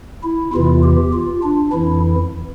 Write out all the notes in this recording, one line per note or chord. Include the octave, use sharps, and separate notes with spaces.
E4
E2 C3 E3 F4
G4
F4
D4
F2 E3 E4